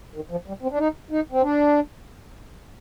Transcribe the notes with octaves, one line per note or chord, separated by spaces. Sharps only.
D#3
F3
G3
C4
D4
D#4
D#4
C4
D4